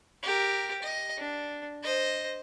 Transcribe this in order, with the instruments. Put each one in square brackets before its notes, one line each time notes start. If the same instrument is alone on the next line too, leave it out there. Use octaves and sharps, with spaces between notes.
[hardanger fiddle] G4 A#4
D#5
D4
C5 D#5